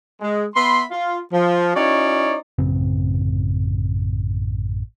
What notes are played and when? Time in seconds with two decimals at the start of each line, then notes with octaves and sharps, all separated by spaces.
0.21 G#3
0.55 B3 E5 B5 C6
0.91 F4
1.32 F3
1.75 C#4 D#4 E4 F#4 C#5 D5
2.59 A1 F#2 C#3 C4